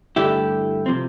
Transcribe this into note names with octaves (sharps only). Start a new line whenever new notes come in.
G2 D3 A3 E4 G4
C3 F3 C4